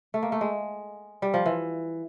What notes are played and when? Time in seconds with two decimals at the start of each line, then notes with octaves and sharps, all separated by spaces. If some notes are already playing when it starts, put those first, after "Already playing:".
0.14 A3
0.23 A#3
0.32 A3
0.41 G#3
1.22 G3
1.34 F3
1.46 E3